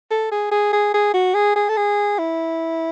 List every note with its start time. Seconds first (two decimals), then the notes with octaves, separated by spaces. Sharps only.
0.11 A4
0.32 G#4
0.51 G#4
0.73 G#4
0.94 G#4
1.14 F#4
1.34 G#4
1.56 G#4
1.69 A4
1.77 G#4
2.19 E4